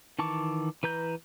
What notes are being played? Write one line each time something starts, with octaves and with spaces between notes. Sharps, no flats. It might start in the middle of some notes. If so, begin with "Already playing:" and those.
D#3 E3 A5 C#6 D6
E3 B4 A#5 G6